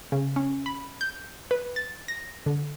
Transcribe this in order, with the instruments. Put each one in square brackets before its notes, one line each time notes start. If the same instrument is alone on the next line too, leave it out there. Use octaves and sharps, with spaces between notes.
[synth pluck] C#3
C#4
B5
G6
B4
A6
A#6
D3